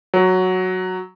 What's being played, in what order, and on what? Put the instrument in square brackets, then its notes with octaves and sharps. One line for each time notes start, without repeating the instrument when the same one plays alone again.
[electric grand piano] F#3